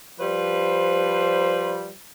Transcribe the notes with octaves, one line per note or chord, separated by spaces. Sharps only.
F3 G3 B4 C5